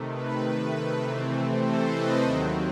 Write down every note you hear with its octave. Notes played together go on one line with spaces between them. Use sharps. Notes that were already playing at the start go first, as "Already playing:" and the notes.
Already playing: C3 D#3 A3
B4
C3 E3 A3 C4
A4 C5
B4 D#5
D#2 D#3 F#3 C4 C5 E5